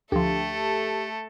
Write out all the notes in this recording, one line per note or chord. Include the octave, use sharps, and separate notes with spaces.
D2 F3 A3 G4 A4